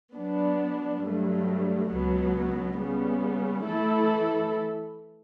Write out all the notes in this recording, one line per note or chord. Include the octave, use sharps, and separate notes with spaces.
F#3 B3 D4
G2 F#3 A3
C#2 B2 F#3 B3
C#3 G3 B3
E3 A3 E4 A4